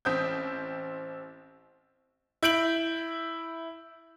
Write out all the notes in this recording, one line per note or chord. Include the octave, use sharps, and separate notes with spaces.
A1 C4 D#6 G6
E4 G6 D7 F#7